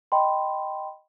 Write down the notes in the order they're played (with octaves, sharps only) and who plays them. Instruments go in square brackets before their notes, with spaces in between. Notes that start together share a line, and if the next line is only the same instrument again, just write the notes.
[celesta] D#5 G5 B5 C6